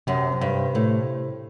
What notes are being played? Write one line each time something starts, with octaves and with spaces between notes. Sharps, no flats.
F#2 C3
G2
A2